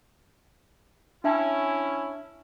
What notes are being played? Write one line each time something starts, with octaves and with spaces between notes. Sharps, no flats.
C#4 D4 E4 E5 A5